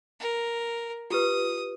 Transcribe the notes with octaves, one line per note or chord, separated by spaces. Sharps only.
A#4
F4 G4 B4 D#6